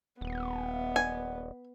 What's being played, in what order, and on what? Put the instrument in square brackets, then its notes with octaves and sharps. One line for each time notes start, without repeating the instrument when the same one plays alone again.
[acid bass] D#1 [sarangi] B3
[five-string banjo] G#5